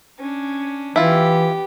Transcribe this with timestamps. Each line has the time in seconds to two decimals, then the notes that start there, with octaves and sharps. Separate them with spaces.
0.19 C#4 D4
0.96 E3 B3 E4 F4 G4